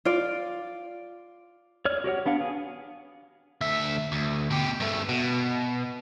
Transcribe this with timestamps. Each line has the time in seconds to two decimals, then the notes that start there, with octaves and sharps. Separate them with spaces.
0.05 F4 D5
1.85 C#5 D5 F6
2.04 F#4 G4 C#5 F#5
2.26 B3 D4 F5 F#5
2.41 G#4
3.61 D2 E5
4.12 D2
4.50 B2 G4
4.80 G2 A3
5.09 B2